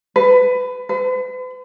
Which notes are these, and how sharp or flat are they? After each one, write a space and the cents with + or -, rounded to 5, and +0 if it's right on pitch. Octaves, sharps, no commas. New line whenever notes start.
B4 +25
B4 +45